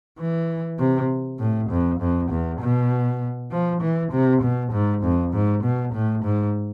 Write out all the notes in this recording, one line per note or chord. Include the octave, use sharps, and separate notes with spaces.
E3
C3
A2
F2
F2
E2
B2
F3
E3
C3
B2
G#2
F2
G#2
B2
A2
G#2